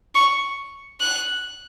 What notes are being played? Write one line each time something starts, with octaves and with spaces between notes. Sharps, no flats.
C#6
F#6